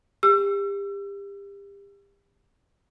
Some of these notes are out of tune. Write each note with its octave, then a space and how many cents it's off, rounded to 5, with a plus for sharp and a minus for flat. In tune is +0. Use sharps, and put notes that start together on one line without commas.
G4 +30 E6 +35